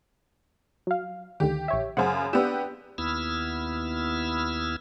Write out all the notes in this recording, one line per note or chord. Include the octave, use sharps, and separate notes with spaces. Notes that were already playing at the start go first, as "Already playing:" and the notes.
F#3 F5
D2 D3 D#3 G4
A#1 C#5 E5
F#2 C#3 C5 F#5
B3 D4 G4 E6
D#2 B3 E4 E6 F6